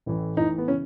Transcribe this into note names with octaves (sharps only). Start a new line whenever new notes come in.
A1 A2 E3
A1 A2 E3 D#4
B3
C#3 E3 C#4